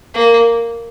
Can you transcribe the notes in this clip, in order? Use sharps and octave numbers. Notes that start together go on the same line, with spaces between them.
A#3